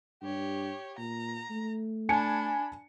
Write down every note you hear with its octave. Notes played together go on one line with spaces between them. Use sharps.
G2 G4 C#5
A#2 A#5
A3
D4 G#5 A5 B5 C#7